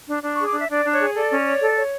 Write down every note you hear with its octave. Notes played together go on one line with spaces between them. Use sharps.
D4
D4
C#6
G#4
D6
D4 E5
D4 D5
D4
C#5
G#4
A4 D5
C#4
C#5
A4
C#5